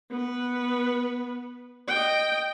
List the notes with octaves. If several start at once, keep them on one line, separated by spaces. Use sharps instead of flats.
B3 B4
D#5 G5